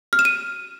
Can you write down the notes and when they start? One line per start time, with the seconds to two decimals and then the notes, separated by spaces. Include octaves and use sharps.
0.13 F6
0.19 E7
0.25 D#7